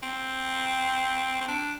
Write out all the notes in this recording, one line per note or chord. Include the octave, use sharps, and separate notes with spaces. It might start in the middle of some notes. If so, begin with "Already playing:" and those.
C4
C4
D4